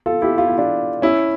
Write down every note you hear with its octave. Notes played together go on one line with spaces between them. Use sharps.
F4 A4
E4 G4
F4
E4
D4 F4
C#4 E4